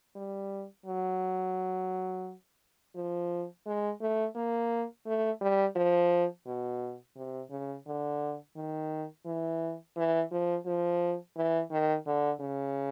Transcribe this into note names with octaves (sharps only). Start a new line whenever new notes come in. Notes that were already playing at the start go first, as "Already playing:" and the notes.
G3
F#3
F3
G#3
A3
A#3
A3
G3
F3
B2
C3
C#3
D3
D#3
E3
E3
F3
F3
E3
D#3
D3
C#3